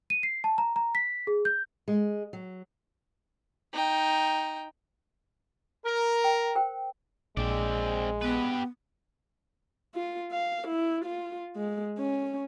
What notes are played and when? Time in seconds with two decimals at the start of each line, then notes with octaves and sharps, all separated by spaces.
0.10 D#7
0.23 C7
0.44 A5
0.58 A#5
0.76 A#5
0.95 B6
1.27 G#4
1.45 G6
1.88 G#3
2.33 F#3
3.73 D#4 G5
5.85 A#4
6.24 G5
6.55 A#4 C5 G5
7.37 A#1 G#3 C4 D5
8.21 B3 G4 B4
9.94 F4
10.32 F5
10.68 E4
11.05 F4
11.56 G#3
11.99 C#4